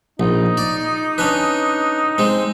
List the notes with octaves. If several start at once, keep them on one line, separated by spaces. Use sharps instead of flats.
A#1 D#4
D5
C#4 D4 B4
G#3 C4